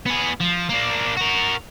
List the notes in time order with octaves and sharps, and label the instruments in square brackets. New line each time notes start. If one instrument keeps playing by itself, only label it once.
[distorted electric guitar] B3 G#4
F3
A#3 D4
F#4 A#4